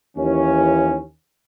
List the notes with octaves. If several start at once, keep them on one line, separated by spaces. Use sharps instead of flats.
D#2 E3 C#4